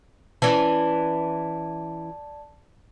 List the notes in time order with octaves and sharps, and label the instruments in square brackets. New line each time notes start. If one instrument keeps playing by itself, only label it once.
[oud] E3 C#4 [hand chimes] D5 A5